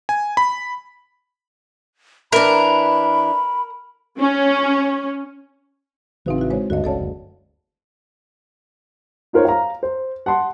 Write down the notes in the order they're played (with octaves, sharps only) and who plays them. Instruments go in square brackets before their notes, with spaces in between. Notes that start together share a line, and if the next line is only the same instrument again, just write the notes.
[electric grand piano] G#5
B5
[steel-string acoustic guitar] E3 D4 [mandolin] A#4 [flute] B5
[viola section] C#4
[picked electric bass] A1 C#3 E3 [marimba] C4 D#4 F#4
[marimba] E4 F#4
G#3 C5 C#5
[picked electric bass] D2 G2 D3 [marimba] F#4 D#5
[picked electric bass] G1 C#2 C#4 [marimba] A4 D5 A5
[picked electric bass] F#1 D2
[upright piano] D#4 F4 A#4 C5 C#5
F5 A#5
C5
F#5 A5 C6